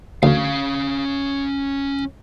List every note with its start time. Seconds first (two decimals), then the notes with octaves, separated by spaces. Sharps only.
0.23 D2 C#4 F5